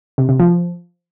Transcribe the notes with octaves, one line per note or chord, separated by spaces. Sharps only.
C3
C3
F3